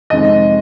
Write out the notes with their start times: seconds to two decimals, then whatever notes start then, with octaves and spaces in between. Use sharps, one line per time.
0.10 F2 C3 D#3 G#3 D#5